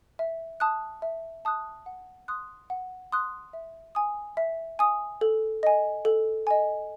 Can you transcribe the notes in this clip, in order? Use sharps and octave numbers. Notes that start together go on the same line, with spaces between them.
E5
A5 D#6 F#6
E5
A5 D#6 F#6
F#5
C6 D#6 F#6
F#5
C6 D#6 F#6
E5
G#5 D#6
E5
G#5 D#6
A4
D#5 G#5
A4
D#5 G#5